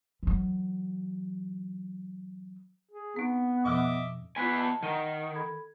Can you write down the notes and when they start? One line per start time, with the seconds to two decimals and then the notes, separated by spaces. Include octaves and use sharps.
0.23 E3 F#3
2.91 G#4
3.16 B3 C4 D#4
3.65 F2 B2 F3 D#5 E5 D6
4.36 B3 F4 G#5 F#6 B6
4.55 D#5 A5
4.83 D#3 F#5 D#7 G7
5.35 A4 B5 G#6